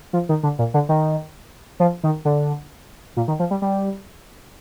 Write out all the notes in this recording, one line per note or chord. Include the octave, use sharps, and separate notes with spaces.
F3
D#3
D3
A#2
D3
D#3
F3
D#3
D3
A#2
D#3
F3
G3
G3